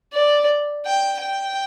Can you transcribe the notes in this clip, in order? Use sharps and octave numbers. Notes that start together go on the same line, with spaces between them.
D5
G5
G5